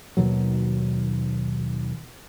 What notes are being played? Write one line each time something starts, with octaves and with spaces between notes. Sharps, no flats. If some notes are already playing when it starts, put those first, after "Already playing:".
D#2 B2 D#3 F#3